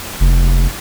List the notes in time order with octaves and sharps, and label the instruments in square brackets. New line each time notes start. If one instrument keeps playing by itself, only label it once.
[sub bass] F1